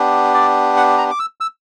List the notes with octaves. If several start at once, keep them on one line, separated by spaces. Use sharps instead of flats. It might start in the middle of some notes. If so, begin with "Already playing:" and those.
Already playing: B3 D4 G4
D5
F#5
A#5
D6
E6
E6